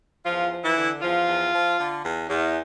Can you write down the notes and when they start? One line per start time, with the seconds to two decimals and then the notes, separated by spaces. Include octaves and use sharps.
0.25 E2 F3 F4
0.50 F3
0.63 E3 E4
0.76 D3
1.01 E2 F3 F4
1.27 E2
1.53 F3
1.78 D3
2.03 E2
2.29 E2